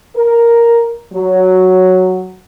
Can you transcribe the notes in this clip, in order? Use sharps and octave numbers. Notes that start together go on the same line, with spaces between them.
A#4
F#3